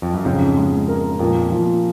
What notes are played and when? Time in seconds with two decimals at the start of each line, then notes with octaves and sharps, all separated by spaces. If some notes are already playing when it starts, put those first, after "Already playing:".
0.02 F2
0.14 F#2
0.25 F2 G#2 C#3
0.57 G#3
0.88 A#4
1.19 F2 A#2
1.51 F3